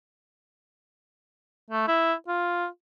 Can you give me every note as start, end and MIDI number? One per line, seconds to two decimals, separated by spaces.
1.70 1.87 57
1.88 2.13 64
2.28 2.66 65